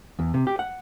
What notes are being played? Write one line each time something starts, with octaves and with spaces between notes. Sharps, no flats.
E2
C3
G4
F#5